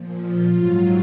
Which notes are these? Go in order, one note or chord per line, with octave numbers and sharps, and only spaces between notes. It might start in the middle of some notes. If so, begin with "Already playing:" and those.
Already playing: A#2 F3
F4
G#2 F#3